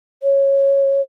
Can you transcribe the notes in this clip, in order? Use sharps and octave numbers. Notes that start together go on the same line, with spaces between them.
C#5